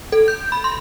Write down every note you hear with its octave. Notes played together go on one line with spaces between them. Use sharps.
A4
G6
B5
C6